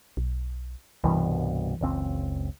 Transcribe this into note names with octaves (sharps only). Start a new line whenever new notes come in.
B1
C2 G2 B2 E3
F#1 C#2 C4